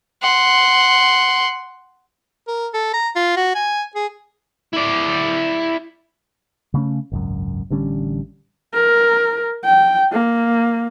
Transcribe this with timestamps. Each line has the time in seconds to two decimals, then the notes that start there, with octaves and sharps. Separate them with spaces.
0.22 F#5 C6
2.48 A#4
2.74 A4
2.94 A#5
3.16 F4
3.36 F#4
3.55 G#5
3.95 G#4
4.73 E4 D5
6.74 C#3 A3 C#4
7.12 G#1 C#2 F#2
7.70 A1 D3 G3 C#4
8.75 A#4
9.64 G5
10.12 A#3